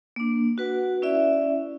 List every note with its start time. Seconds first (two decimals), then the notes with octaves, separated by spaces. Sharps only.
0.16 A#3 D4
0.58 F#4 B4 F#5
1.02 C#4 E4 D5 E5